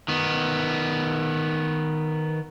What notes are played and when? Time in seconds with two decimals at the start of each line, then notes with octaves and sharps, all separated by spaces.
0.08 D#3 B3